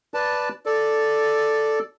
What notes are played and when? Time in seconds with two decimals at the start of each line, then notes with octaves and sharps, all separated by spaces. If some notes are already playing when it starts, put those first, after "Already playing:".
0.14 B4 D5 A5
0.66 A4 D5